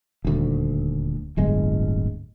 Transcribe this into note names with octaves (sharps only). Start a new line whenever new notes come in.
D#1 D2
D1 G1 G#3